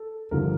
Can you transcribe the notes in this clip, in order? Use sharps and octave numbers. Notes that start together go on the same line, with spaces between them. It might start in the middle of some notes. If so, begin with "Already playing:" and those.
Already playing: A4
G1 G2 D3 F3 A#4